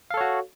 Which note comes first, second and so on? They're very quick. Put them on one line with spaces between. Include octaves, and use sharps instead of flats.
F5 A4 C#5 F#4